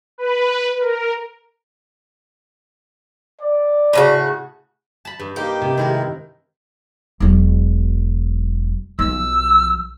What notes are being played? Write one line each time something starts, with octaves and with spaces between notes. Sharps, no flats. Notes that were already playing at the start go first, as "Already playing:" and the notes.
B4
A#4
D5
A2 C#3 F#4
A5 B5
G2
A#3 D#4 G4
C3
D#3 G#3 C4 D#4 E4 A#4
E1 F#3
B1 F3 E6